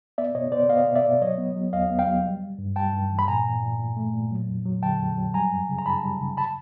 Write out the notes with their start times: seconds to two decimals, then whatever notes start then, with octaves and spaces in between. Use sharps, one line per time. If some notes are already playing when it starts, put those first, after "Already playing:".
0.18 B3 D5 E5
0.35 B2 C#5 D#5
0.52 B3 C5 D5
0.69 B3 D#5 F5
0.87 B2
0.95 D5 E5
1.04 B2
1.21 F#3 C#5 D#5
1.38 B3
1.56 F#3
1.73 E2 D#5 F5
1.91 B3
1.99 F5 G5
2.07 F#3
2.24 G3
2.42 G3
2.58 G2
2.76 G3 G5 A5
2.94 G2
3.11 E3
3.19 B5
3.28 A#2 G#5 A#5
3.44 A#2
3.62 A#2
3.79 A#2
3.97 A3
4.13 A#2
4.31 F#3
4.49 F2
4.65 F#3
4.82 D3 G5 A5
5.00 F2
5.17 F#3
5.34 G3 G#5 A#5
5.52 F#2
5.69 C#3
5.78 A#5
5.86 F#2 A5 B5
6.03 G3
6.21 C#3
6.37 A5 B5